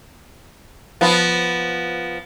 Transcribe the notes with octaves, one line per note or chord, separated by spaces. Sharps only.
F3 B3